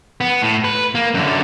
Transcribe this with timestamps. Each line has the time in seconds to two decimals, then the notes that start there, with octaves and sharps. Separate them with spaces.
0.21 B3
0.42 A2
0.64 B4
0.95 A#3
1.14 F#2 D3